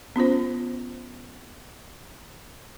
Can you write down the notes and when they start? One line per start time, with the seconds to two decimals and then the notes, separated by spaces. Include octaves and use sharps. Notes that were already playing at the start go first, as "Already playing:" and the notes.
0.16 B3 C#4 F4 C5